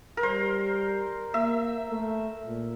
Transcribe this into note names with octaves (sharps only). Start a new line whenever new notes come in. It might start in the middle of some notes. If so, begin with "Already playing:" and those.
A#4
G3 C5
A#3 E5
A3
A#2